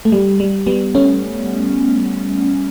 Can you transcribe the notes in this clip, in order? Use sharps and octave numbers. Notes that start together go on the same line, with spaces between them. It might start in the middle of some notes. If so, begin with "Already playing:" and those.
A3
G3
G3
G3 B3
A3 C#4